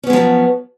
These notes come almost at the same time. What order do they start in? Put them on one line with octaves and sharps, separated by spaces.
C#4 B3 G#3 F3 F#3